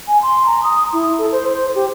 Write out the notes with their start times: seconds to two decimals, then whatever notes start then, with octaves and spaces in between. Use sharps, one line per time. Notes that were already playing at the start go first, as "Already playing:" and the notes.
0.08 G#5
0.22 C6
0.46 A#5
0.63 D#6
0.93 E4
1.19 A4
1.32 C5
1.48 C5
1.75 G4